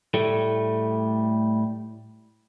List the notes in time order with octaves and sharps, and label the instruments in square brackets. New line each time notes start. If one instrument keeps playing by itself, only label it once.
[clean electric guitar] A2 G3 A3